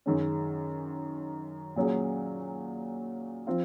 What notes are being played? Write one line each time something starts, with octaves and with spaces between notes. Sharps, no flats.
F#2 D#3 G#3 C#4
A#2 F#3 C#4 G#4
F3 C4 F4